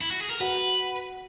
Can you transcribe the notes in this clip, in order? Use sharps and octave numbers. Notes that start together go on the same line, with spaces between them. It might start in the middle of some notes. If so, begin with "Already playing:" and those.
E4
F#4
G#4
A#4
F#4 B4 F#5